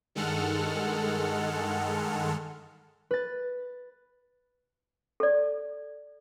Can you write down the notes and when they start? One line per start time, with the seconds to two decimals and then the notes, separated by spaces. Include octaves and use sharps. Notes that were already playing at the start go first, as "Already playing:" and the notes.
0.15 G2 D#3 G#3 A4 F#5 F6
3.11 B4 A6
5.20 A4 D5